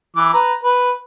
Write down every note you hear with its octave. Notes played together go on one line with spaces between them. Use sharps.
E3 D6
B4 A#5
B4